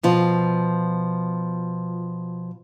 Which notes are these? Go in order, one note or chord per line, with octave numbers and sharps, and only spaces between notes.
B2 F3 F4